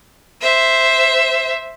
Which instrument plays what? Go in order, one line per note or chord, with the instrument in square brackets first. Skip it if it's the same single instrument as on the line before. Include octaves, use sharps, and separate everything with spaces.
[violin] C5 E5